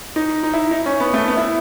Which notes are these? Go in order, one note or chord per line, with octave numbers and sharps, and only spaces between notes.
D#4
D#4
E4
D#4
C#4
B3
A3
B3
E4